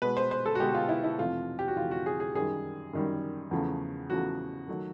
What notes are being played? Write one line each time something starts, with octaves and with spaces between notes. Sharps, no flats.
B2 G#3 B4
C5
C5
A4
F#4
B2 G#3 G4
F4
E4
E4
F2 C3 E3 A3 F4
G4
F#4
F2 C3 E3 A3 F4
F#4
G#4
G#4
F#2 D#3 G3 G#4
F#2 D#3 G3
E2 C#3 F3 A3
E2 C#3 F3 A3 F#4
D#3 F#3 A3